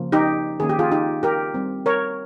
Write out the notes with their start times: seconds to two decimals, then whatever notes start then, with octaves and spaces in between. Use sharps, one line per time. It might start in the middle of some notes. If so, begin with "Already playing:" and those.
Already playing: C#3 F3 A#3 C#4
0.12 D#4 G4
0.60 D#3 A#3 C#4 G#4
0.69 G4
0.79 F4 G#4
0.91 D#4 G4
1.23 G4 A#4
1.54 G3 C4
1.86 A#4 C#5